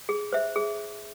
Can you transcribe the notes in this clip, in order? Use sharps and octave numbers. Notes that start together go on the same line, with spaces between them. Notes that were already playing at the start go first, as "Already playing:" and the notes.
G#4
C5 E5
G#4